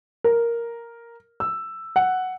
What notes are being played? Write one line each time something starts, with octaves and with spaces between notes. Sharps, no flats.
A#4
E6
F#5